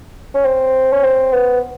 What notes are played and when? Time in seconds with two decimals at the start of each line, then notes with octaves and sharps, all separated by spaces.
0.35 C#4
0.45 C4
0.92 C#4
1.04 C4
1.32 B3